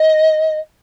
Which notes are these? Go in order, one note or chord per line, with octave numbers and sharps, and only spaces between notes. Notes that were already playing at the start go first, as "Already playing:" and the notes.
Already playing: D#5